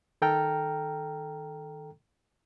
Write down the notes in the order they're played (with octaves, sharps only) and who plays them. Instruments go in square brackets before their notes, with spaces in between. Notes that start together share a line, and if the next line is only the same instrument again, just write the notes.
[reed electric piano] D#3 A4 G5 A#5 F6